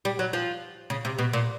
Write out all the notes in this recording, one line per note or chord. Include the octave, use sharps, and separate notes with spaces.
G3
F#3
F3
C#3
C3
B2
A#2